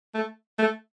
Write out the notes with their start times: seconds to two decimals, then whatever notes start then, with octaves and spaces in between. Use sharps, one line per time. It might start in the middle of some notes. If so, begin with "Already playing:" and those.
0.14 A3
0.58 A3